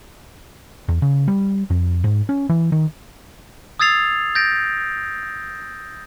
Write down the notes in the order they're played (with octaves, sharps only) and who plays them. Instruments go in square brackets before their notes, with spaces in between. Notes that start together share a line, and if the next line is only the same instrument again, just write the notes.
[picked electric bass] E2
C#3
G3
F2
G#2
C#4
E3
D#3
[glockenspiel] D#6 E6 G#6 A6 C7 F7
G6 A6 A#6 D7